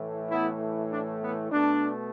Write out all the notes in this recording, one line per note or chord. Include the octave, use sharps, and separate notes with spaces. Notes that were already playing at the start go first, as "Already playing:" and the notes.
Already playing: A2 E3 A3
B3 E4
D4
B3
B2 A3 D4